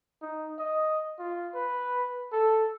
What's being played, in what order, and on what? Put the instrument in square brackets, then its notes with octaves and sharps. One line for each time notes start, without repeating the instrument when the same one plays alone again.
[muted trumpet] D#4
D#5
F4
B4
A4